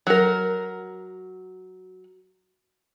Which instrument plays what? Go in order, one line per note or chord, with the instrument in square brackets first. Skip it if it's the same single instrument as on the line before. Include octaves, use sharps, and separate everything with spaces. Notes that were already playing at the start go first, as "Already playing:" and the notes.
[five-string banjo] F#3 A#4